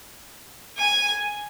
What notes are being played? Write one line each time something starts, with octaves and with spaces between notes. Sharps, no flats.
G#5